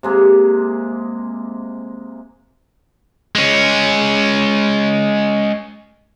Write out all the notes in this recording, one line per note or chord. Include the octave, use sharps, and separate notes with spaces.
C3 G#3 A#3
G#3 C#4